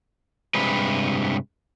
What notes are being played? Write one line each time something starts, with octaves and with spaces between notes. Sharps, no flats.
G2 C3 G#3 B4